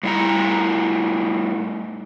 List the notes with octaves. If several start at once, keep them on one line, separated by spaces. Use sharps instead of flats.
A2 G3 E4 F5 A#5